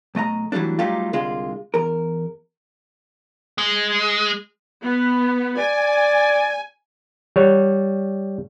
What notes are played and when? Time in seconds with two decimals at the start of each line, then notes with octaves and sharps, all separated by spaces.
0.15 B1 A3 D#5 A#5
0.52 E3 F#3 G3 A3 D4
0.79 F#3 G3 A3 D#4 F4 G4
1.13 C2 D3 G#3 F4
1.74 E2 A#4
3.58 G#3
4.83 B3
5.58 D5 G#5
7.36 G3 C#5